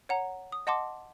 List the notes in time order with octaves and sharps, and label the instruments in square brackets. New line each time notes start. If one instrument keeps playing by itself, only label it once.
[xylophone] C#5 F#5 A#5
D#6
D#5 F#5 A5 C6 D6